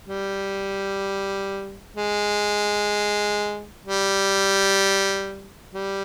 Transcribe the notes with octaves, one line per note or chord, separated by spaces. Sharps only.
G3
G#3
G3
G3